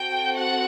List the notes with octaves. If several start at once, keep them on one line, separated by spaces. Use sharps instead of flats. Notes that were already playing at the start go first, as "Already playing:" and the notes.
Already playing: C4 F#4 A4 G5
F#5